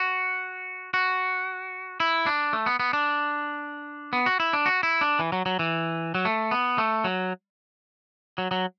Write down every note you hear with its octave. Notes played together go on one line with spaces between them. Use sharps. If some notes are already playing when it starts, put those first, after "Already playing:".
Already playing: F#4
F#4
E4
D4
A3
B3
B3
D4
B3
F#4
E4
D4
F#4
E4
D4
E3
F#3
F#3
E3
F#3
A3
B3
A3
F#3
F#3
F#3